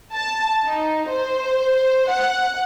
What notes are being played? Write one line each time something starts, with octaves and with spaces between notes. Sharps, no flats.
A5
D#4
C5
F#5